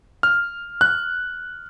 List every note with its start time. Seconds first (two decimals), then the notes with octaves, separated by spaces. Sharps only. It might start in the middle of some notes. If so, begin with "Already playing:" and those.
0.23 F6
0.81 F#6